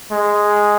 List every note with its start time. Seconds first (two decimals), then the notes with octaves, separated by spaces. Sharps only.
0.12 G#3